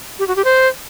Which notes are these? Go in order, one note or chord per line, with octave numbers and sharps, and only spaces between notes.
G4
F#4
G4
C5